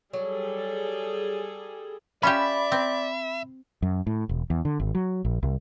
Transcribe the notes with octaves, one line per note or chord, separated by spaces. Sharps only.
F#3 G3 G#4 A4
C#4 F4 G4 D5 E5 B5
C4
F#2
A2
E1
E2
D3
G#1
F#3
A#1
C2